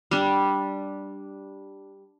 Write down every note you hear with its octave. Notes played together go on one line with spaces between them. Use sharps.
G3 D4